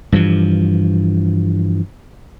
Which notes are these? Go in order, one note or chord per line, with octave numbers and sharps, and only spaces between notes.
G2 E3 F3